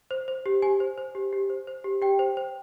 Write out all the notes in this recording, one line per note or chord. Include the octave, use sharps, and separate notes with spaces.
C5
C5
G4
G4 G#5
C5
C5
G4
G4
C5
C5
G4
G4 G5
C5
C5